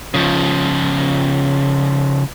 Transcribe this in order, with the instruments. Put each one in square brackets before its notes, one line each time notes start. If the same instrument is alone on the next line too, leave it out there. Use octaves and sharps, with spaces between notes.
[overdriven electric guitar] C#3 F3